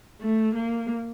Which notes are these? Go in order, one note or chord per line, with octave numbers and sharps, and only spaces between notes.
A3
A#3